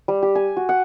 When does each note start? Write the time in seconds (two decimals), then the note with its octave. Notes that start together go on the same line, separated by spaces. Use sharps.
0.08 G3
0.22 G4
0.35 G#5
0.57 F#4
0.69 F#5